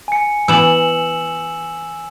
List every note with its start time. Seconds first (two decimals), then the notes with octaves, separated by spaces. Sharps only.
0.08 G#5 C#7
0.48 E3 B3 E6 E7 F#7